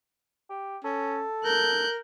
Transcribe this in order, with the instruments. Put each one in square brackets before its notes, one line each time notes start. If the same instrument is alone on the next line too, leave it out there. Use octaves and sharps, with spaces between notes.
[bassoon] G4
[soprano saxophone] C#4 [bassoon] A4
[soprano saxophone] A#4 [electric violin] F#6 G6